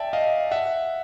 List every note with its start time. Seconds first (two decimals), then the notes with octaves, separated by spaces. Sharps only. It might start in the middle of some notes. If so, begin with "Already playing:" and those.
Already playing: D5 E5 G5 A5
0.13 D#5 F5
0.51 E5 F#5